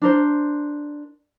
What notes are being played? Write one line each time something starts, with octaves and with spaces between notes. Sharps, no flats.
D4 A#4 C5